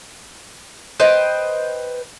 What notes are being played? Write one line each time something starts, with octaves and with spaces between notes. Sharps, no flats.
B4 C5 D#5 G5